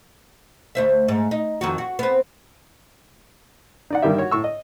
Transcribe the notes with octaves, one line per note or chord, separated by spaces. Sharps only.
D2 C5 E5
G#2
D#4
F2 D#3 F#4
F#4
B3 C4
D#4 D5 F#5
G2 D#3 G3 A#3 G4 E5
F#4 C#5
A2 C#6 E6
D#5